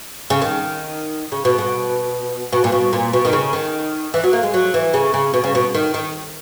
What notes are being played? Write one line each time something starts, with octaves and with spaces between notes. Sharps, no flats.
C#3
D#3
C#3
B2
B2
B2
A#2
B2
A#2
B2
D#3
C#3
D#3
E3
F#3
A#3
G#3
F#3
E3
C#3
C#3
B2
C#3
B2
D#3
D#3